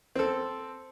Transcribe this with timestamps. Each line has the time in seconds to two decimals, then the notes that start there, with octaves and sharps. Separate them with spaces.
0.16 C4 A4